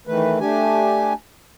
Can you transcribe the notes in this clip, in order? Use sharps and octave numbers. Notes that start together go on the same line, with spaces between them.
D#3 E3 A3 B4
A3 D4 G4 G#5